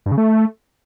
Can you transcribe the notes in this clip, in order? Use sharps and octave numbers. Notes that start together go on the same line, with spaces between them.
G2
C#3
A3